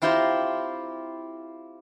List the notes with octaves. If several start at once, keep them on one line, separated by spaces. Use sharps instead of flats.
C4 E4 F4 G4 C5 A#5